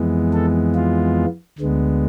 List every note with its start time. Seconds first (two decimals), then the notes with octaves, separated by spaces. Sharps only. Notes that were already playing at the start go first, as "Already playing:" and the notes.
Already playing: F2 E3 G#3 B3
0.33 A4
0.75 F4
1.59 D2 D3 G#3 B3